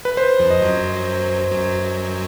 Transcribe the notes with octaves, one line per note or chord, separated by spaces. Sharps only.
B4
C5
F2 F3
D#5
F#2 F#3
F#2 F#3